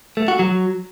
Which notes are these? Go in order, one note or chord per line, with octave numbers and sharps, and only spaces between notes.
A3
F#4
F#3